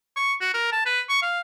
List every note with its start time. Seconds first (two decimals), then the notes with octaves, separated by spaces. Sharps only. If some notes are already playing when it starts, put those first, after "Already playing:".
0.16 C#6
0.41 F#4
0.54 A#4
0.72 A5
0.86 B4
1.09 C#6
1.22 F5